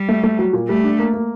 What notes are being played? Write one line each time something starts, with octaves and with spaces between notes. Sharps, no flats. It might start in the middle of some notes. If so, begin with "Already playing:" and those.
Already playing: G3
A3
A3
F#3
A#2
G3 A3
D4
A#3
A#3